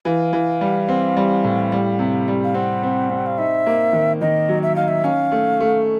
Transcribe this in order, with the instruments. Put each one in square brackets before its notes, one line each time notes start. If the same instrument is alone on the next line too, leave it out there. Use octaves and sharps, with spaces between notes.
[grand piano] E3 [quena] F5
[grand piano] E3
G3
C4
G3
A2
G3
C3
G3
[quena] F5
[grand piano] C4 [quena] F#5
[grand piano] C4
C4
[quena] F5
[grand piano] D#4 [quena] E5
[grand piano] A#3
D#3
[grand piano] D#3 [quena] D#5
[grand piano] F#3
[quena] E5
[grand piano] D#4 [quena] F5
[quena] E5
[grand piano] C#4 [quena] F5
[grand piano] A3
A3